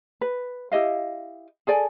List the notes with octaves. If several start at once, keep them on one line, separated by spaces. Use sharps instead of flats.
B4
E4 G4 D#5 F5
G#4 A4 D5 G#5